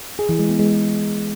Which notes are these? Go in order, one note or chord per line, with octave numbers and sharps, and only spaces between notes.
G#4
E3
G#3
B3
G#3